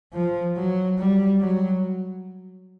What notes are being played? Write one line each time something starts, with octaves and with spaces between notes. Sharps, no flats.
F3
F#3
G3
F#3